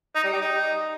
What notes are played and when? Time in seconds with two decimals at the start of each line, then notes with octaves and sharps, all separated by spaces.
0.15 D#4
0.24 G3
0.33 G4
0.41 D#4